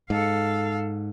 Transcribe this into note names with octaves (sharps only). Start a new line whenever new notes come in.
G#2 A4 F5